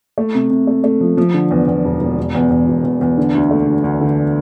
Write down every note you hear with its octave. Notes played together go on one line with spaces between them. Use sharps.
A3
C3
C3
A3
A3
F3
F3
D3
E2
E2
E1
E1
E1
E2
E2
E1
E2
E2
D3
D2
A3
D2
D2
D3